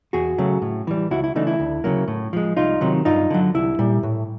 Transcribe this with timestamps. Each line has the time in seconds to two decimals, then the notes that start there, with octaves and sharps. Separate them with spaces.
0.13 E2 F#4 G#4
0.38 C#3 F#3 A3
0.62 A2
0.87 E3 G3
1.11 C#2 E4 F#4
1.24 E4
1.35 C#3 E3 A3 D4 D#4
1.47 E4
1.60 D2
1.84 C#3 F#3 A#3
2.08 A2
2.33 F3 G#3
2.57 C2 D#4 F4
2.81 C3 D#3 F#3
3.05 G2 D#4 F4
3.30 D3 F#3
3.54 C2 E4
3.79 A#2 G3
4.03 A2